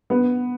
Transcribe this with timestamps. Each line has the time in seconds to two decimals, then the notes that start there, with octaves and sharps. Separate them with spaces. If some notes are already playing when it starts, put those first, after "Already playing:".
0.10 B3